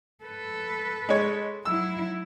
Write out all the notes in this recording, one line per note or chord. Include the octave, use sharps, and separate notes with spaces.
A4 B4
G#3 C#5
F#3 E4 E6